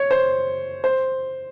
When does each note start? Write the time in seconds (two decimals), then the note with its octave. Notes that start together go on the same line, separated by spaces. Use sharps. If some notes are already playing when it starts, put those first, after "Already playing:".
Already playing: C#5
0.11 C5
0.84 C5